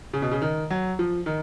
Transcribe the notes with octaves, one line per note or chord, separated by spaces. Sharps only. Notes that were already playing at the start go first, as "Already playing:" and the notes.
C#3
B2
C#3
D#3
F#3
F3
D#3